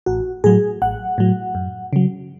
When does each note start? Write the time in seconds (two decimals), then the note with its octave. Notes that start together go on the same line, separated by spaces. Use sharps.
0.06 A1 F#4
0.44 A2 F#3 G#4
0.82 A1 F#5
1.18 A2 F#3
1.55 F#2
1.93 C#3 F#3